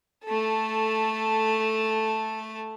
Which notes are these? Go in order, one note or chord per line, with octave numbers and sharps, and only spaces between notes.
A3 A4